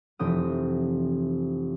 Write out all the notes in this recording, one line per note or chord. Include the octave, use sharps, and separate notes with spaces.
F1 E3 C4 G5 D#6